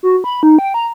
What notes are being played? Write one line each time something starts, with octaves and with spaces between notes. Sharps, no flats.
F#4
B5
D#4
G5
A#5